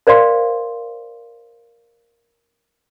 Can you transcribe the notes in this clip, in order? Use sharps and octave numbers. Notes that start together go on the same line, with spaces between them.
A#4 C5 D5 F5 C6